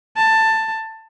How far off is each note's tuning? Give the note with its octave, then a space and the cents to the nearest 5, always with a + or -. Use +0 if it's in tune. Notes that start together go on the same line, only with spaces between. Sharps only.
A5 +10